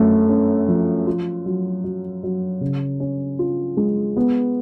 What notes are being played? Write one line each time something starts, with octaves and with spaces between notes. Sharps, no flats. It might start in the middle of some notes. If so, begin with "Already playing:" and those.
Already playing: F#2 A3
C#4
F3
F4
F#3
F#3
F#3
C#3
C#4
F4
G#3
B3